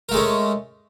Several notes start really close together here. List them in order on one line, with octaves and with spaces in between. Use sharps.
A#4 A3 G#3 C#4